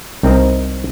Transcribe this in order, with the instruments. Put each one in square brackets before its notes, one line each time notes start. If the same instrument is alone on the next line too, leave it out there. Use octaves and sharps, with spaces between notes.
[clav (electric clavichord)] C2 C4 D#4 A#4 D#5 A#5